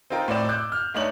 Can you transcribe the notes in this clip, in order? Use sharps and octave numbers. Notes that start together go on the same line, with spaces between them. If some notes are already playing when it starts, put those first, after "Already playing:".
C4 D#4 F4 A#4 G5
A2 C4 D5 E7
D6 E6 F#6 G6
F6
G2 A3 D#4 C#5 D5 F#7